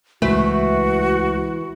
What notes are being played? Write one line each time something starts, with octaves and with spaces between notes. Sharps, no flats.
C#2 E3 G#3 A3 F#4 B4 C5